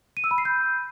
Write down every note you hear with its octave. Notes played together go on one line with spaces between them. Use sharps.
D#7
E6
B5
C7
G6